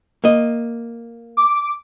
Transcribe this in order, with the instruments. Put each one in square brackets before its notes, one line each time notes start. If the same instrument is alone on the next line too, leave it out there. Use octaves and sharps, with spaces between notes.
[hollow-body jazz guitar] A#3 D#5
[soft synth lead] D6